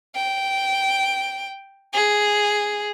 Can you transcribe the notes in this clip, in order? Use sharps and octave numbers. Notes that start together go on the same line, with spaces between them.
G5
G#4